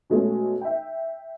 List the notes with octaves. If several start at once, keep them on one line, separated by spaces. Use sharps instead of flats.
B2 G#3 A3 C#4
E5 G5